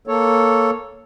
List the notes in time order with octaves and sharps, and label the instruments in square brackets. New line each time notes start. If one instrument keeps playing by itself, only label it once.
[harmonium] A#3 A4 C#5